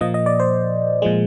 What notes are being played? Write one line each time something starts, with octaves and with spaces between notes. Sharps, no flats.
A#2 F3 A#3 D#5
D#5
D5
C5
A#2 F3 G#3